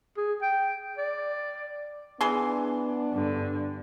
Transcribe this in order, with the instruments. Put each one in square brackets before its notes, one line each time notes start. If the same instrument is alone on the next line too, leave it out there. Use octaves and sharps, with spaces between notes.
[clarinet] G#4
G5
D5
[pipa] E3 G#4 C6 [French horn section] B3 D4
[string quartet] G2 D3